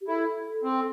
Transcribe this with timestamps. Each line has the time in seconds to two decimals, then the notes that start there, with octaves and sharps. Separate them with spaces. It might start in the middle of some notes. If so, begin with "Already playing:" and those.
0.01 G4
0.08 E4 A4
0.63 C4